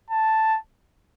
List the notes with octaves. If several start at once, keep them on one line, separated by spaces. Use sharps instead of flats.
A5